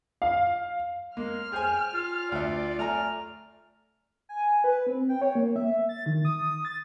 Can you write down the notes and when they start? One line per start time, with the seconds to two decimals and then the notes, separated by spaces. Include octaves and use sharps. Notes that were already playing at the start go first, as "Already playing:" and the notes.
0.22 F5
1.17 G#3 A#3 F6
1.52 G#4 C5 G5 G#5
1.94 F4
2.32 D2 D5 E5
2.79 A3 G#5 A#5 F6
4.29 G#5
4.64 B4
4.87 C4
5.09 G5
5.22 C#5
5.35 A#3
5.56 E5
5.89 A6
6.06 D#3
6.25 D#6
6.65 A6